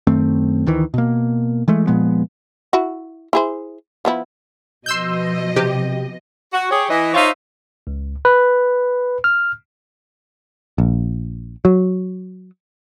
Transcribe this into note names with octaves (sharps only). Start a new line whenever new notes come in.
F#2 D#3 A3 C4
D2 D#3 E3
B2 A#3
E3 G#3 A3
A#2 F3 G#3 B3
E4 F#4
E4 G#4 C5
F3 B3 E4
B2 F3 D#5 C6 E6 G6
C3 G4
F#4
G4 G#4 C#5
E3 D#5
D#4 F4 C5 C#5 E5 F5
C#2
B4
F6
A#1
F#3